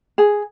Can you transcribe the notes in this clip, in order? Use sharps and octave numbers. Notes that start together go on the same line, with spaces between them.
G#4